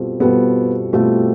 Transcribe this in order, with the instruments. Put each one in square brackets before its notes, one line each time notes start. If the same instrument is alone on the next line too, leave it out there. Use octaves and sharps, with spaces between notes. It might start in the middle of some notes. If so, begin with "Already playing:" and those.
Already playing: [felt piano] B2 G3 C4 F4 A4
[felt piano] B2 G3 C4 F4 A4 [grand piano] B3
[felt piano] B2 G3 C4 F4 A4 [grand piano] A3